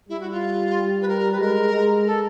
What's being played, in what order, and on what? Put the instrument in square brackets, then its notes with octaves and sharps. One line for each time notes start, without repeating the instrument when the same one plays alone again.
[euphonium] G3 [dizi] E4
[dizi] F#4
F4
B4
A#4
B4
[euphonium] G#3 [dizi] A#4
[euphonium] G#3
[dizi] A4